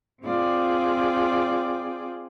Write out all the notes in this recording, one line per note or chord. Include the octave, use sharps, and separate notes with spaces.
C4 F4 G#4 D5 G5